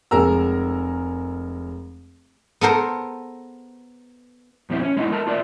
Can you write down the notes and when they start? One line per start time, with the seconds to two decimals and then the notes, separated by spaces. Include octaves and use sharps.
0.11 F1 G#3 G#4 A#4 A#5 E6
2.61 B3 A4 A#4 C5
4.70 F2 B2 C4 E4
4.83 C#4
4.97 G#3 B3 D#4 E4
5.12 A3 A#4 A5
5.27 F4 A#4 D5 E5